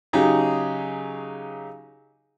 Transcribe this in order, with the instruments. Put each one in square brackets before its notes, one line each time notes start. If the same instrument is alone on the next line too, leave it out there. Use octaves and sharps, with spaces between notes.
[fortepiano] C#3 F#3 D#4 G4 G#4